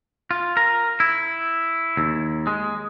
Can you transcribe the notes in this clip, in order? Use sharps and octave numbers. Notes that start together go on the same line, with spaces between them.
F4
A#4
E4
D#2
G#3